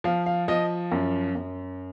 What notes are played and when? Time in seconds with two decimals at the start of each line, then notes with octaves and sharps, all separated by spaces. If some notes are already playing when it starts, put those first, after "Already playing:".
0.04 F3 F5
0.26 F5
0.48 F3 D#5
0.92 F#2
1.35 F#2